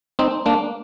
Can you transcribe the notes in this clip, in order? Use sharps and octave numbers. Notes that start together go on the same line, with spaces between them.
C4 D#4
A#3 D4